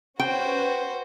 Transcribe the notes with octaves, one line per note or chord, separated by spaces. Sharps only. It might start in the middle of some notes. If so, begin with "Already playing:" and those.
C#4 F#4 B4 C5 G5